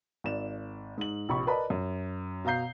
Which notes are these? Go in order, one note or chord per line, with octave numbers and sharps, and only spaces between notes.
G#1 D5 E7
G#2 F#7
A#1 C3 B5 C#6
A#4 B4 D5 D#5 A5 B5
F#2
B2 F5 A#5 G6 C7